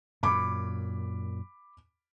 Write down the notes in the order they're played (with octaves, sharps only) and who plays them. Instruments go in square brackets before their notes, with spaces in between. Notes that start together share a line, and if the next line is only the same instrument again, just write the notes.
[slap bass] F#2 A#2 [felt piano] B5 D6